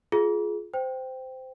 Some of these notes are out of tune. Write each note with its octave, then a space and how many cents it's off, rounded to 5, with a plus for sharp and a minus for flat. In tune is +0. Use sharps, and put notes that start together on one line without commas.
F4 +0 G#4 +20
C5 -15 G5 +0